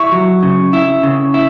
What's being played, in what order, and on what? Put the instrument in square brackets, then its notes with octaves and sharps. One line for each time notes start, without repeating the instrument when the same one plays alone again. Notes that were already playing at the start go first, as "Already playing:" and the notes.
Already playing: [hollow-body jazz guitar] E4 [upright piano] C#6
[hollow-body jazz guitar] F#3
C#3
E4
C#3
E4